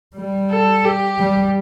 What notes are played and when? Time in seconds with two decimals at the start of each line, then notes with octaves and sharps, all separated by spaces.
0.16 G3
0.50 A4
0.84 G4
1.19 G3